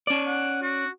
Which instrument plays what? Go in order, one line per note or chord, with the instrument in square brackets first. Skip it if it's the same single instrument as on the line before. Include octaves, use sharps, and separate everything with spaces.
[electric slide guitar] C#4 D5
[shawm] F#5
F#4